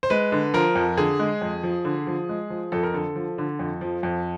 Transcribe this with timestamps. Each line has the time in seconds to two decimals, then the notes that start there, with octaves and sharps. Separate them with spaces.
0.03 C5
0.10 G#3 B4
0.32 D3
0.54 F3 A#4
0.76 F2
0.97 D3 G#4
1.20 G#3
1.41 F2
1.63 F3
1.85 D3
2.07 F3
2.29 G#3
2.50 F3
2.72 F2 A4
2.83 A#4
2.94 D3 A4
3.16 F3
3.38 D3
3.59 F2
3.81 F3
4.03 F2